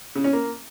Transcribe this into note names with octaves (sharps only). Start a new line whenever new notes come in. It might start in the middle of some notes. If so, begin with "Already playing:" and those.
C#3
C#4
A#3